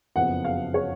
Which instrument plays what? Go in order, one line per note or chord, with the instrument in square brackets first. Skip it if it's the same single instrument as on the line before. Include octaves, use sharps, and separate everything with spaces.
[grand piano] F#1 F2 F3 B3 [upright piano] F#5
[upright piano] F5
C#5